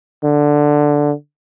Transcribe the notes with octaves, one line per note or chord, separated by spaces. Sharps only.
D3